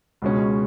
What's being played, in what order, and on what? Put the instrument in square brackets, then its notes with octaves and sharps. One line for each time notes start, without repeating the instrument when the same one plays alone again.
[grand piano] C#2 B2 G#3 C#4